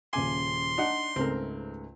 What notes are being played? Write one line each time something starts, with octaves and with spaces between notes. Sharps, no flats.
D#1 C#3 G#5 C6 D6
D4 D#4 F#5
C#2 G#2 A3 C4 A#4